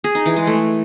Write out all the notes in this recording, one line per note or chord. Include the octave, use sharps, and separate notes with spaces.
G#4
D#4
E3
G#3
A3